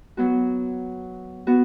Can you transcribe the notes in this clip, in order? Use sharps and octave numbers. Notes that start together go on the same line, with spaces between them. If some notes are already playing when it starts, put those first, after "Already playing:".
F#3 B3 F#4
B3 F#4